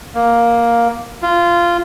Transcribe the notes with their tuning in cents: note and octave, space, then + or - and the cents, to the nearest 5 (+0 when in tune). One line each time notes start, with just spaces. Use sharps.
A#3 +5
F4 -15